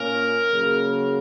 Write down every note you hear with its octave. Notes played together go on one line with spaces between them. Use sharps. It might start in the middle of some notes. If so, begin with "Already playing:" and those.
Already playing: A#2 A#3 C#4 A#4
C#3 F#3 A#3